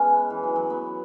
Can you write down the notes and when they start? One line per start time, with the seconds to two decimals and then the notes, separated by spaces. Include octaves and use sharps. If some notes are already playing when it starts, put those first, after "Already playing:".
Already playing: G#3 B3 C#4
0.30 E3
0.43 F#3
0.56 F#3
0.70 B3